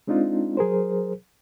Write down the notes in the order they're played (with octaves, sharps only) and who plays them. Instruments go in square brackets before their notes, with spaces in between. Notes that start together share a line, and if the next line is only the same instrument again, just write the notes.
[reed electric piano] G#3 C4 D4 D#4 F4
F#3 G#4 A#4 C5